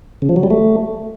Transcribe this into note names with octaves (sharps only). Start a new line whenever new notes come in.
C#3
F3
F#3
G3
A3